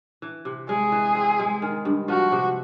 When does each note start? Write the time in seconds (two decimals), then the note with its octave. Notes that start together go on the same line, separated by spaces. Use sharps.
0.22 E3
0.45 C3
0.69 G#3 G#4
0.92 E3
1.15 C4
1.39 G#3
1.62 D#3
1.85 G2
2.08 F3 F#4
2.32 C3